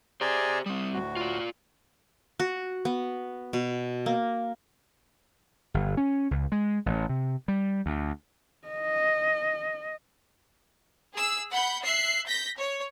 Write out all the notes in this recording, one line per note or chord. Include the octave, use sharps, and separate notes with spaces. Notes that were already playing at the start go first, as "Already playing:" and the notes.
G4 G#4 C5 D5 A#5
G3 C4 D#6
D2 A2 F#4
F4 D5
F#4
B3
B2
A#3
G1
C#4
C#2
G#3
A1
C3
G3
D2
D#5
G#4 E6
F#5 B5 G6
E5 F#6 C7
G6 A#6 B6
C#5